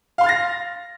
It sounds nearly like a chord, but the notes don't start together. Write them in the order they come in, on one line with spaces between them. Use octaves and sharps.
F5 C6 F6 A6 A#6